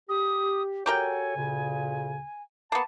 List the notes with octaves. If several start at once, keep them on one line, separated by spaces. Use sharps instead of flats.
G4 D#6
F#4 G4 A4 A#4 C#5 G5 G#5
D2 A#2 C#3
A#3 B3 A5